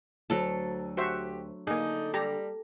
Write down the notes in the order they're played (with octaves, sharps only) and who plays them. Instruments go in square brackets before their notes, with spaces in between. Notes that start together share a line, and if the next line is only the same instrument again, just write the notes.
[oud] D2 [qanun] F#3 A4 A5
[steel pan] F#4 C5 E5 [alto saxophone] G4
[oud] D3 [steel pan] A#3 G#4 [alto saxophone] D#4
[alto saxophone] G3 [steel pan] G4 A4 A#5